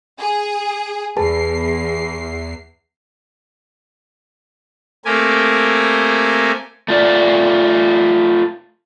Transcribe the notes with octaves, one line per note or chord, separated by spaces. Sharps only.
G#4
E2 G#4 B4 A5 C7
A3 A#3 C4 G4 A#4 G#5
A3 F4 D5